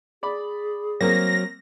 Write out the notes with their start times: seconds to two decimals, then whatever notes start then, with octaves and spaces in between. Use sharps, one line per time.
0.23 G#4 D5 B5
1.01 F#3 A#3 C4 A#4 A#6